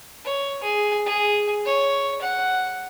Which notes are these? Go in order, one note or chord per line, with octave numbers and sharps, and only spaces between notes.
C#5
G#4
G#4
C#5
F#5